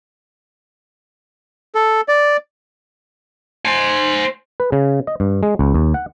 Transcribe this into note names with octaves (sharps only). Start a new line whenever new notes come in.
A4
D5
C5 G#5
B4
C#3
D#5
G2
G#3
C#2
D#2
F#5